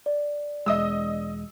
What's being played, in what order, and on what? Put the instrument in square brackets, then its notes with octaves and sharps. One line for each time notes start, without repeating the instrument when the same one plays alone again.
[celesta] D5
[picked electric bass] E1 G#3 [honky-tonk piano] D#5 D#6 E6